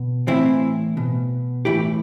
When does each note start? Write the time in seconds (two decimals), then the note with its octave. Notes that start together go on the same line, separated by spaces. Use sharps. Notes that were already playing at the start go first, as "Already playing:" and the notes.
Already playing: B2
0.28 A2 E3 C4 E4
0.97 B2
1.65 A2 E3 E4 G4